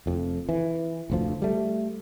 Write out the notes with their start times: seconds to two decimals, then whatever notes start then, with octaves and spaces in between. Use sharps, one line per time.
0.06 F1 F2
0.49 E3
1.10 F1 D2 F3
1.42 G3 A3